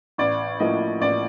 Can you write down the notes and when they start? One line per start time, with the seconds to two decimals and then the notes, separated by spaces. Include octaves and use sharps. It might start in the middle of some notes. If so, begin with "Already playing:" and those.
0.18 A1 D5
0.60 A2 F3 A#3 D#5
1.01 A1 D5